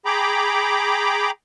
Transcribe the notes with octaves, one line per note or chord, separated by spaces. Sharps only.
G#4 G5 A#5 B5 D6